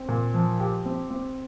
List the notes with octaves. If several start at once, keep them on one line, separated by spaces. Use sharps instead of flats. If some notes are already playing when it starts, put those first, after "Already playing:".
Already playing: C4
A#2
F3
G4
C4
C4